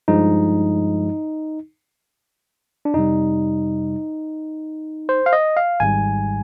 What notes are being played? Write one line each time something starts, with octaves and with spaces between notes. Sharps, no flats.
G2 F3 G#3 D#4
D4
F2 C3 G3 D#4
C5
F5
D#5
F5
G#1 G#2 G3 G#5